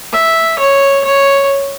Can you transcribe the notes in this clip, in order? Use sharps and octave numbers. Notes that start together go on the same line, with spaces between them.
E5
C#5
C#5